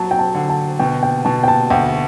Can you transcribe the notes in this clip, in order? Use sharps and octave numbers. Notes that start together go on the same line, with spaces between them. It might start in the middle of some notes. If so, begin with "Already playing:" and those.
Already playing: F#3 A5
G5
A5
D3
A5
B2 G5
G5
B2 A5
G5
A5
D2 G5